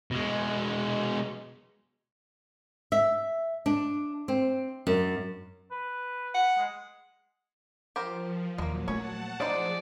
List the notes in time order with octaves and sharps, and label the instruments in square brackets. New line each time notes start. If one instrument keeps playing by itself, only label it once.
[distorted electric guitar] B2 G#3
[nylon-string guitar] E5
D4
C4
F#2
[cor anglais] B4
[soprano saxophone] F#5
[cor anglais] G#3
[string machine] F3 [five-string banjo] G4 A#4 C5
[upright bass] D#2 [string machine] A#2 F#3 [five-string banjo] G#3 A#3
[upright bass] A3 [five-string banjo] C#4 C#5 [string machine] F#5 A5
[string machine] F3 G#4 [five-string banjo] D4 D#4 C5 [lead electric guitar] D5